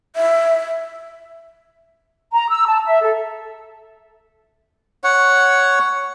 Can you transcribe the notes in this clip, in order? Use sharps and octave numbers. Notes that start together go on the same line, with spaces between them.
E5
A#5
E6
A5
E5
A4
C#5 F#5